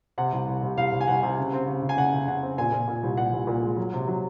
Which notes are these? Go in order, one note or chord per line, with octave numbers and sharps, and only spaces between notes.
C3 F#5
C2
C2
C2
C2 F5
C2
G#5
C2 F#5
C3
C#3
C4
C#3
C#3
G#5
C#3 F#5
C#3
C#3 F#5
C4
A#2 G#5
A#2
A#2
C2
A#2 F#5
C2
A#2
G#3
F#3
C3
F#3